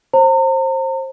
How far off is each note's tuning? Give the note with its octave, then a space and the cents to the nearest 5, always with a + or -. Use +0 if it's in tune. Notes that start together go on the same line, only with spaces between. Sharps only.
C5 +25 A#5 -40